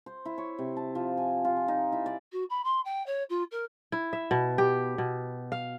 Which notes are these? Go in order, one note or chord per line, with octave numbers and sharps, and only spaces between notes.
C5
E4
C#5
C3
A5
F3
G#5
F4
G#5
D#4
E4
D5
F#4
B5
C6
G5
C#5
F4
A#4
E4
E5
B2
G4
B2
F5